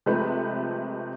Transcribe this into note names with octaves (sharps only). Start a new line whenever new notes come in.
C3 F3 G#3 A3 B4